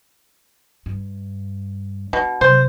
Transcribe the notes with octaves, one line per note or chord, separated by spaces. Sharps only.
G2
B2 D4
C3 F#3 C5